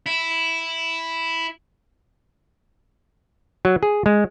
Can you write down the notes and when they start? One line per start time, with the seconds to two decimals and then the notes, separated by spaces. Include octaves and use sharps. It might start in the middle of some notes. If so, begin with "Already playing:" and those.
0.06 E4
3.65 F#3
3.83 G#4
4.06 G#3